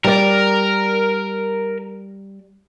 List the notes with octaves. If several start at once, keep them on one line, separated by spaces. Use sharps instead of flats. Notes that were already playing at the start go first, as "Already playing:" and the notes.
G3 A#4 D5